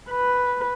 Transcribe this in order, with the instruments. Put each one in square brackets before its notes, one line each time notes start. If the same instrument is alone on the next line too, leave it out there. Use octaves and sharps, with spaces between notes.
[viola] B4